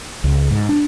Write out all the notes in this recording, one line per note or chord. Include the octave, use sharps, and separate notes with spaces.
C#2
G#2
D4